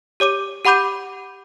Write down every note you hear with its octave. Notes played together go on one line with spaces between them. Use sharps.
G4 C#5 D6 D#7
G4 F#5 B5 D6 G6 D#7